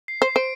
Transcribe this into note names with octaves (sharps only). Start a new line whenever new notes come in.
C7
C5 C7
C5 D7